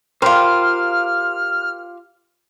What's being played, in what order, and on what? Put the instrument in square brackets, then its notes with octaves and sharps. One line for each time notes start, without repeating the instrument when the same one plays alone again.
[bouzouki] F4 G4 [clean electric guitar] A#4 C5 [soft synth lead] F6